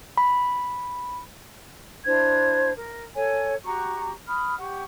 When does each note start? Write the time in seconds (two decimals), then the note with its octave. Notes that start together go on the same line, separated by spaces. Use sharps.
0.17 B5
2.04 D4 E4 C5 G#6
2.75 A#4
3.14 A4 C#5 G#5
3.63 F#4 G4 A#5 C#6
4.26 B5 D#6 F6
4.58 G4 F#5 C#6